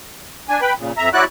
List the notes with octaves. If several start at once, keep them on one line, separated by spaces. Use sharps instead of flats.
D4 G#5
B4 G5 B5
A#2 C#3
F2 E5 A#5
F#3 E4 F#4 D5 F#6